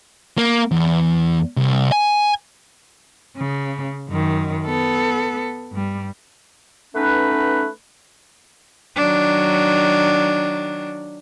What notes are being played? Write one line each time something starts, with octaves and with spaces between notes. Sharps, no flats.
A#3
E2
C2
G#5
C#3
F#2 D#3
B3 A4
G2 G3
A3 B3 C#4 D#4 B4
D#3 F#3 D4